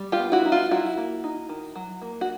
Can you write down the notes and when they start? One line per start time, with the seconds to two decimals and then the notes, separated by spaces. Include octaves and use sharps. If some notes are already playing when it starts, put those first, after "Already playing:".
Already playing: G3
0.12 F4 G4
0.19 B3
0.32 E4 F#4
0.45 D#4
0.52 F4
0.71 F#3 E4 F#4
0.97 A#3
1.24 D#4
1.49 D#3
1.76 F#3
2.02 A#3
2.21 F#4